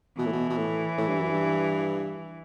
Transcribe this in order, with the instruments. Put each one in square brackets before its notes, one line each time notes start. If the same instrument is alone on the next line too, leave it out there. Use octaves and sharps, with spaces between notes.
[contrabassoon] B2 [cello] E3
[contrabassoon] A2
B2
B2
A2
A2
G2
F#2
G2